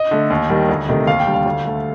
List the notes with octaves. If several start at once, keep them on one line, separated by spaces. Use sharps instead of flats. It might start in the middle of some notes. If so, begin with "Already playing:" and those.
Already playing: D#5
D3 A3
D#2
D#3 G3
D2
C3 D#3 A3
D#2 F5
G5
D3 G3
F5
D2
D3 A3